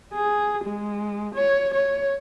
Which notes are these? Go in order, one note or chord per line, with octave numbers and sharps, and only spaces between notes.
G#4
G#3
C#5
C#5